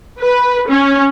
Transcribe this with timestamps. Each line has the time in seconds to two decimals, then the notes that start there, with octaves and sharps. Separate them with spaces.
0.20 B4
0.68 C#4